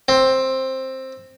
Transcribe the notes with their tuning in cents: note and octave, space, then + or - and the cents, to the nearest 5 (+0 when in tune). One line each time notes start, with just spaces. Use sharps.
C4 +10